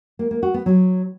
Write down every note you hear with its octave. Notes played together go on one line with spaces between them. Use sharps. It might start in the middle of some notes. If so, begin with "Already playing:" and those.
A#3
A#3
F#4
B3
F#3